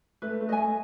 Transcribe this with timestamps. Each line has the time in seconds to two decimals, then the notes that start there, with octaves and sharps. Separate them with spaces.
0.22 A3 B4
0.41 A3
0.49 D#5 G#5
0.57 A3